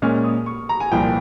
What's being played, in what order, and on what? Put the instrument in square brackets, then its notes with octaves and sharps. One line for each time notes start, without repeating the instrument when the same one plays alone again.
[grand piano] A#2 G#3 C#4 [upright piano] F6
[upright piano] D#6
C#6
A#5
G#5
[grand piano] C2 A#2 F3 [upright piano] G5